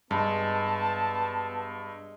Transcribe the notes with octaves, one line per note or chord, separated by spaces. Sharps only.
G2 G#3 B3 A5